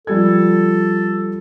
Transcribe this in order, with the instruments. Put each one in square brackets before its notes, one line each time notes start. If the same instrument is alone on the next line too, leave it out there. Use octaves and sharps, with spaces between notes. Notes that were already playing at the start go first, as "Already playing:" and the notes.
[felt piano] F3 G3 G#6 [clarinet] A4